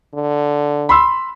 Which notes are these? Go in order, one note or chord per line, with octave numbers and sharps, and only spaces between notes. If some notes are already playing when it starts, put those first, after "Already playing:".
D3
B5 C6 E6